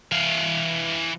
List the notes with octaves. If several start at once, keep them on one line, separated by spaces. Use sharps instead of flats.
E3 F5